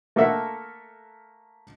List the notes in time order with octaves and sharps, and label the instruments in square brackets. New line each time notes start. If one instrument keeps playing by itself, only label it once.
[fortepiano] A3 A#3 A4 A#4 E5 F#5